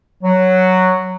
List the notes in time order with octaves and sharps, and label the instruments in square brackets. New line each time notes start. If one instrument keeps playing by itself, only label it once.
[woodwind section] F#3